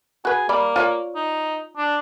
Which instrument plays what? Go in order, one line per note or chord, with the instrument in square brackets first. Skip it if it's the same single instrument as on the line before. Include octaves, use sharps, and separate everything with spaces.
[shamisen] F#4 B4 [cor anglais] G#4
[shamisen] G3 D5 B5 [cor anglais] A#3
[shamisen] F4 C#5 D5
[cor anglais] D#4
D4